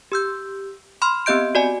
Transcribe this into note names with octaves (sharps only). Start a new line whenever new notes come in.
G4 E6 G6
B5 C6 F6
B3 C4 G4 D#5 G6 D7
F#4 D5 G#5